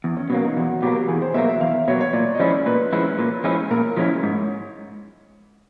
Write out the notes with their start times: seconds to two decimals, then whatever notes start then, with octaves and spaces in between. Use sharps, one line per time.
0.04 E2
0.17 C#4
0.30 B2 F#3 A#3
0.44 D#4
0.57 E2 F#4
0.82 B2 F#3 A#3 G4
1.08 E2 G#4
1.22 C5
1.34 B2 F#3 A#3 E5
1.49 E5
1.61 E2 F5
1.74 E5
1.88 B2 F#3 A#3 C#5
2.01 C#5
2.13 A#2 D5
2.35 D#5
2.39 F3 G#3 C#4 E4 D5
2.66 A#2 B4
2.93 F3 G#3 C#4 E4
3.19 A#2
3.44 F3 G#3 C#4 E4
3.71 A#2 A#4
3.96 F3 G#3 C#4 E4 C#5
4.23 G#2